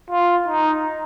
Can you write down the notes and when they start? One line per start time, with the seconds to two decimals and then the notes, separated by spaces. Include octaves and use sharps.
0.11 F4
0.48 D#4